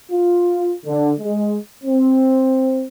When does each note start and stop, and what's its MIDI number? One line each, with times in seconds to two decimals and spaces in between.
0.11 0.73 65
0.86 1.11 50
1.19 1.59 56
1.84 2.86 60